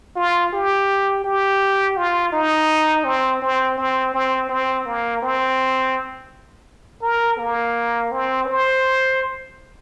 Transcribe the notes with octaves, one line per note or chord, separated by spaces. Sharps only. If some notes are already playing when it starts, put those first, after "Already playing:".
F4
G4
G4
F4
D#4
C4
C4
C4
C4
C4
A#3
C4
A#4
A#3
C4
C5